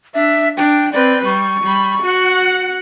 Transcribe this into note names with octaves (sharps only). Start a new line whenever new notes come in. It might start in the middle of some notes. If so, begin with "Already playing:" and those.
D4 E5
D4 G5
C4 B4 D5
G3 C#6
G3 B5
F#4 F#5